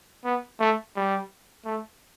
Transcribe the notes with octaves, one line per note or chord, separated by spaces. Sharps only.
B3
A3
G3
A3